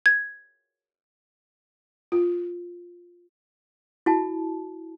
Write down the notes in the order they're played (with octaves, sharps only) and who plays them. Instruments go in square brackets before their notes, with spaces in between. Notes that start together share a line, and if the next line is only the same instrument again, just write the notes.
[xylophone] G#6
[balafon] F4
[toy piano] E4 F#4 A5